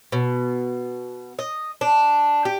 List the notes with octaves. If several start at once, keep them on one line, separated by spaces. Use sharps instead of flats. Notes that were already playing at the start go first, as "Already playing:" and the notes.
B2
D#5
D4
G4